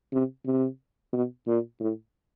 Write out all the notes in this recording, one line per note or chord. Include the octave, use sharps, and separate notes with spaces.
C3
C3
B2
A#2
A2